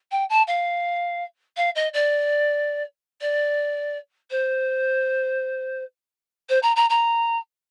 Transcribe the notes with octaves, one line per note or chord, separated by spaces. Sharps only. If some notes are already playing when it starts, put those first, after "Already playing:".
G5
A5
F5
F5
D#5
D5
D5
C5
C5
A#5
A#5
A#5